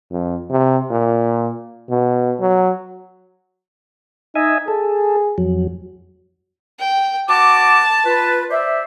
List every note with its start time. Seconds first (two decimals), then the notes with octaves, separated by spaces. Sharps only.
0.11 F2
0.50 C3
0.90 A#2
1.90 B2
2.40 F#3
4.35 D#4 D#5 E5 G#5
4.68 G#4 A4
5.38 F2 F#3
6.80 G5
7.29 F#4 F#5 A5 D6
8.05 F4 B4
8.51 C5 D5 E5